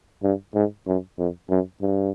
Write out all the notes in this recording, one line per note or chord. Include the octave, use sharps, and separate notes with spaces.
G2
G#2
F#2
F2
F#2
G2